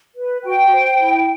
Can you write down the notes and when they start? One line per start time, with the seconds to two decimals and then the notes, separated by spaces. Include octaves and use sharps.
0.15 B4
0.43 F#4 G5
0.71 C5
0.99 E4